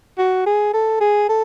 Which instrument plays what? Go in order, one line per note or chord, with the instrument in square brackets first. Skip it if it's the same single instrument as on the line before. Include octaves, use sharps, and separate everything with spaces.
[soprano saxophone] F#4
G#4
A4
G#4
A4